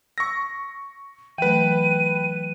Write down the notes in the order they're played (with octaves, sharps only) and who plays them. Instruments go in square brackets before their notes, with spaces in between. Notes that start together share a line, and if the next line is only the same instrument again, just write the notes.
[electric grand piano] C#6 A#6 [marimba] E6
[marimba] E3 F#3 A3 [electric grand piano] B4 G5 [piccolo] D#7